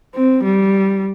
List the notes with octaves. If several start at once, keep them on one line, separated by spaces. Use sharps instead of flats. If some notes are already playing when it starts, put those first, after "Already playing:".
C4
G3